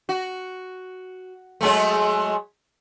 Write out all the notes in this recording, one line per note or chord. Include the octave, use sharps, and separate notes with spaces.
F#4
F#3 G#3 A3